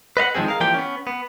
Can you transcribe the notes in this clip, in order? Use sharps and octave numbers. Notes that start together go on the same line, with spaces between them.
B4 D#5 F5 F#5
D#3 F3 G#3 C4 G#4
G#4 A#4 F5
E3 F3 A#3 G4 D5 G5
B3 C#4
B3